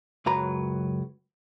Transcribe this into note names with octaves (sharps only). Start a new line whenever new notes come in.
C#2 F#2 F#3 B4 A#5